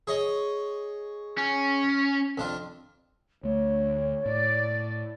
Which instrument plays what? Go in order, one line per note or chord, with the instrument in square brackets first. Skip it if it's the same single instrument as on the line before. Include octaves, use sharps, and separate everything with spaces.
[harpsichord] G#4 C#5 D#5
[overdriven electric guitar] C#4
[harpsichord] F2 D4 F4
[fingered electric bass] D2 A3 [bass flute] C#5
[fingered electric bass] A2 [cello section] D5